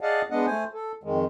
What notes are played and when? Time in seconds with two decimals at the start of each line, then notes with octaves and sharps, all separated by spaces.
0.01 G#4 D5 D#5 F5 F#5 A5
0.31 G#3 B3 D4 D#5 F#5
0.46 A3 C5 G#5
0.74 A4
1.03 F2 D#3 G#3